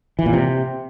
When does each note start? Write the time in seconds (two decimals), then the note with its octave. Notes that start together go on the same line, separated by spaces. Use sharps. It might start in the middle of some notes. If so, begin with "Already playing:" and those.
0.19 E3
0.26 A#2
0.33 C3